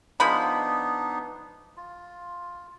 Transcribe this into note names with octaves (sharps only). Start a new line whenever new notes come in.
F3 G#3 B3 D4 D#4 B5
F4